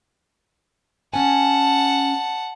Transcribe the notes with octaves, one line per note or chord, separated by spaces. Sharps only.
C#4 F#5 G#5 A5